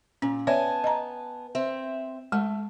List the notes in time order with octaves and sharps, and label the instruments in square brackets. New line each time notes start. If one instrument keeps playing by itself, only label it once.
[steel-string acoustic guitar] A#2 [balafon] C#4
[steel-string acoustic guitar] B3 G#5 A5 [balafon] C#5 D5 E5
[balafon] D#5 A#5
[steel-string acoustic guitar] C4 E5
[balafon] G#3 [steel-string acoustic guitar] A3